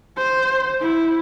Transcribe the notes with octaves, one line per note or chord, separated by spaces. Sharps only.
C5
E4